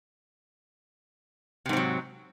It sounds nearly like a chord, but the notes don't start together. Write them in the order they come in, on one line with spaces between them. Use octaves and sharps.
C3 G#2 C4 F#3